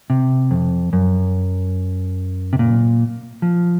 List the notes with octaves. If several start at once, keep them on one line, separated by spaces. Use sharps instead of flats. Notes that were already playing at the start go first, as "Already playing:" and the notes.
C3
F2
F#2
C3
A#2
F3